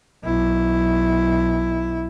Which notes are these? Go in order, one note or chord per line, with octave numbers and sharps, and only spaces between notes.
B1 E4